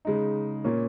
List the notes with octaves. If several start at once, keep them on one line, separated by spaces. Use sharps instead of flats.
C#3 G#3 D#4
A#2 A#3 C#4